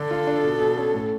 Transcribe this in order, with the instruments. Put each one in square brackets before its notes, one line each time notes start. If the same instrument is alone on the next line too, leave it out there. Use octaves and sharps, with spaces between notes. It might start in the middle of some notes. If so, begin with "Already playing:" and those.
Already playing: [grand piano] D3 D4 [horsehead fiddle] A4
[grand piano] F4
D4
B2
B2
C#4
A2